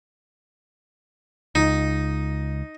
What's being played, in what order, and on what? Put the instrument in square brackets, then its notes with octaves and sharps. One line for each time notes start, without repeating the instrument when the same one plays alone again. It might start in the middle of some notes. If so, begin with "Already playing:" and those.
[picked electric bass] C#2 [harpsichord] D#4